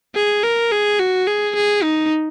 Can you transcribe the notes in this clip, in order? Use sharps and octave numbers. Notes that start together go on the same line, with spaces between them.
G#4
A#4
G#4
F#4
G#4
G#4
D#4